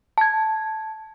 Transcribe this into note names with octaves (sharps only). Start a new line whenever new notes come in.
A5 G#6